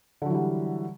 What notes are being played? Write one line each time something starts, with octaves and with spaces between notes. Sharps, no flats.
D3 E3 F#3 G3